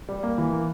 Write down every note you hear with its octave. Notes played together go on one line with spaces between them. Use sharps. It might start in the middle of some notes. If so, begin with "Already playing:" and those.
G3
A#3
E3
A#3